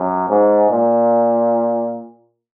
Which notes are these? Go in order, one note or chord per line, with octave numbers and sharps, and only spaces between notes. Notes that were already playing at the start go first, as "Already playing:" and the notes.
Already playing: F#2
G#2
A#2